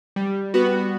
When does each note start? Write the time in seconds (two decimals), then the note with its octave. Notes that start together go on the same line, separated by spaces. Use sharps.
0.16 G3
0.54 B3 F#4